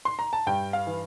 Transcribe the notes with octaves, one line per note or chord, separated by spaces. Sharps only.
C6
A#5
A5
G2 G5
F5
E3